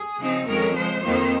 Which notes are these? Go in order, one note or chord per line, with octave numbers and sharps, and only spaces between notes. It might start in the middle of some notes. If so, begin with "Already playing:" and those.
Already playing: G#4
C#3 F3 C4 D#4
F2 D#3 G#3 C#4 A#4
C#3 F3 G#3 C5
F2 D#3 A#3 D#4